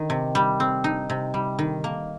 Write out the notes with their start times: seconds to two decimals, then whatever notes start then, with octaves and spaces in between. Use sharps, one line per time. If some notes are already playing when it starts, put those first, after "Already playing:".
Already playing: D#3
0.10 C3
0.35 G3
0.60 C4
0.84 D#4
1.10 C3
1.34 G3
1.59 D#3
1.84 A#3